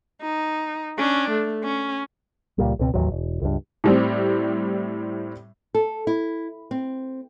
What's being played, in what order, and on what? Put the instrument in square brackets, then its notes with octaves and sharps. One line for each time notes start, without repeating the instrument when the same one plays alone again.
[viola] D#4
C#4 D4
A3
C#4
[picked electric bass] C#2 A#2 G3
C#2 B2 C4
A1 D#2 G#2 F#3
E1
C#2 G2
[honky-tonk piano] A2 G3 C4
[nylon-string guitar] A4
E4
C4